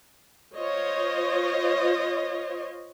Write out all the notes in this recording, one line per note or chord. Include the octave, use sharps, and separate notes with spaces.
F4 C5 C#5 D#5